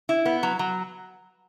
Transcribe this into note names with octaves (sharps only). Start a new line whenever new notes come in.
E4
B3
F#3
F#3